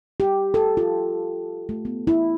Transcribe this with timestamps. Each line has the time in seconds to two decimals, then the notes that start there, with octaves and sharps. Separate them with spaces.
0.20 G4
0.54 A4
0.77 F4
1.69 A3
1.85 B3
2.07 E4